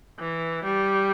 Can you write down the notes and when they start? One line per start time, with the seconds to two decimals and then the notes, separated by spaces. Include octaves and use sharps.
0.19 E3
0.64 G3